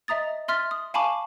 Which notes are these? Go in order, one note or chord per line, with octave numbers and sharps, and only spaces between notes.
D#5 E5 A#5 D#6 A6
E5 C6 F6 A6 B6
D#6
F5 G#5 A5 B5 C#6 D6